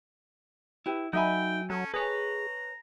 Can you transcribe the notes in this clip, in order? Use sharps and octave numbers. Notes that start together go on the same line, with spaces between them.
E4 G4 B4 G5
F#3 D#4 A4 E5 G5 G#5 B5
F#3 C#4 A4 A5
G#4 B4 C#5 A#5